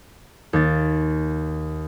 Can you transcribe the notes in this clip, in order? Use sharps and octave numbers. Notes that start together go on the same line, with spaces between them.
D#2 A6